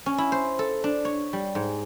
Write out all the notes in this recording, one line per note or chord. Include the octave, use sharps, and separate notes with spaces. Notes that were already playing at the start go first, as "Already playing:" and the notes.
C#4
E4
C5
A4
D4
C#5
G3
G#2